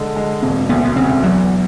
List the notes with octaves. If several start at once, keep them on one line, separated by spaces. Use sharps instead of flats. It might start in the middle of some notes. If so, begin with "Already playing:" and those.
Already playing: D3 G#3
G#3
E1 C4
D2 B3
B3
C#3 C4
E2 F#3